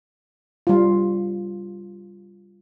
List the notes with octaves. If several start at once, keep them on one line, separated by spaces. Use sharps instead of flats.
G3 F4